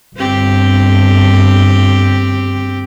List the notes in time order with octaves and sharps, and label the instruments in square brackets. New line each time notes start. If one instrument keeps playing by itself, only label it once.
[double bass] G1 [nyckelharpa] C4 G4